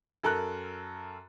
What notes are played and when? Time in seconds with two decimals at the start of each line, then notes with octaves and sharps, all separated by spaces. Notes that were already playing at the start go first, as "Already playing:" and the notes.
0.23 F#2 A4 A#4 F#6